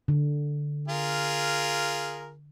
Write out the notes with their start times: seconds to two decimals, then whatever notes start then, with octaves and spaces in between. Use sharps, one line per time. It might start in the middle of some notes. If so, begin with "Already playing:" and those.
0.08 D3
0.88 F4 G#4 A#4